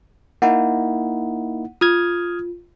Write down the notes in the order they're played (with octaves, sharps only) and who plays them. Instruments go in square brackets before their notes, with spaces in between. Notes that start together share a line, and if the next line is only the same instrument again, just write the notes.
[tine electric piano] A#3 D#4 E4 [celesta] F#5
[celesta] F4 [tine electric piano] D#6 F6 G#6